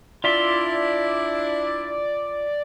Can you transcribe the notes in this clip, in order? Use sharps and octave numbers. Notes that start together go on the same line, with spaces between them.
D4 E4 F4 D5 E5 C6